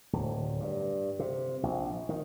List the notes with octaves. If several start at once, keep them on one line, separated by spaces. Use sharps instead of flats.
D1
G2
C3
A#1
D#3